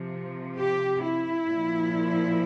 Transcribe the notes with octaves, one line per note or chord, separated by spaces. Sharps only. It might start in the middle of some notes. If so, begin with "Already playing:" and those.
Already playing: C3 F3
G4
E4
A#2 F3